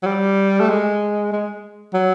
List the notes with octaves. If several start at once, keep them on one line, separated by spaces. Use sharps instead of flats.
F#3
G3
A3
G#3
G#3
F#3